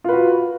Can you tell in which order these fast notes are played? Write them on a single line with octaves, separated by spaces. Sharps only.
F4 B4 F#4